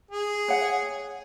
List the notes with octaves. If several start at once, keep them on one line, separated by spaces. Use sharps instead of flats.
G#4
C#5 F#5